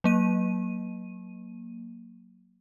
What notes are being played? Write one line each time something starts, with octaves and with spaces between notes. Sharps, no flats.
F#3 A#3 D#7